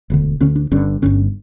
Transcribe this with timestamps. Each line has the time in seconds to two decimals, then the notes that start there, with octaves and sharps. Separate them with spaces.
0.10 E1 D2 D3
0.40 D2 D3 C#4
0.56 D4
0.71 G1 G2 D3 C#4
1.02 G1 G2 D3 C#4